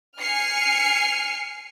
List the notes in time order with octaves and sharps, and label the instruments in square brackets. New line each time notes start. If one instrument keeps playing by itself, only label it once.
[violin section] G#5 F6 C7 C#7